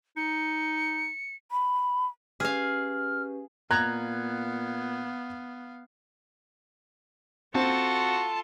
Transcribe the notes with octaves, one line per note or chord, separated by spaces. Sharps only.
D#4 C#7
B5
C#4 G4 G#4 B4 F5 F6
A#2 B3 F5 A#5 F#6 G#6
C4 F4 F#4 A4 A5